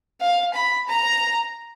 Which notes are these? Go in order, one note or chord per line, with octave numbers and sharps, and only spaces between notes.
F5
B5
A#5